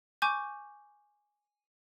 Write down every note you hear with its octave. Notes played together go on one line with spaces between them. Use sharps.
G#5 C#6 D6 G6